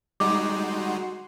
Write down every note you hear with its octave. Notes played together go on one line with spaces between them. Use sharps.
G3 G#3 D#4 F#4 C6 D6